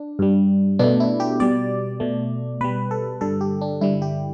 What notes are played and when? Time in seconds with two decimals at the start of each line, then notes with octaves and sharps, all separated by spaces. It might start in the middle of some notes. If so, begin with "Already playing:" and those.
Already playing: D4
0.19 G2 G3
0.79 B2 A3 D4
1.00 E4
1.20 G4
1.40 B2 G3 D5
2.00 B2 A3
2.61 B2 G3 B4
2.91 A4
3.21 G2 D3 G3 A4
3.41 G4
3.61 D4
3.81 G2 D3 G3 E4
4.02 G4